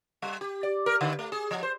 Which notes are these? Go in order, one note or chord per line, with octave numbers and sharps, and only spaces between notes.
G3
G4
D5
A#4
D3
A3
G#4
F3
C5